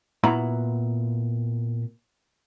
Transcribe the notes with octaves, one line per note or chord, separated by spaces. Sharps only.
A#2 B3 E4 F#4 A#5 B5